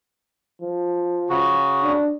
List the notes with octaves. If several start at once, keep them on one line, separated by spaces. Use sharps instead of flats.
F3
C#3 F#4
D4